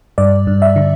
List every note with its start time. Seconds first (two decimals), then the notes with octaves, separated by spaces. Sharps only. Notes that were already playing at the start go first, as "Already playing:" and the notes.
0.18 G2 D5
0.47 G2
0.62 E5
0.76 D3